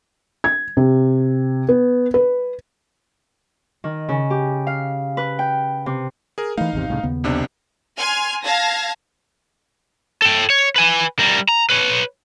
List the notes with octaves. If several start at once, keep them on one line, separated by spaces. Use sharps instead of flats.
G#6
C3
B3
B4
D#3
C#3
G4
F5
B4
G5
C3
G#4 A#4
E3 A3 D#4 F5
G#1 E2 C3
C2 A2 C#3
D#2 C#3 B3
B1 C3 D4
G#5 C6 F6 G#6
F5 A5 G#6 A#6
A4 G5
C#5
B4 G#5
G3 A#4
A#5
B4 C#5